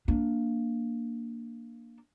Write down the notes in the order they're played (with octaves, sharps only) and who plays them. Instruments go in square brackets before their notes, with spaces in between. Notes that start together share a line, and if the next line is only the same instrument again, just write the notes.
[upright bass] A#3 D4